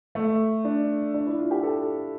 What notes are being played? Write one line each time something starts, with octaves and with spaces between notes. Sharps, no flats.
A3
D4
D4
E4
F4
G4
A4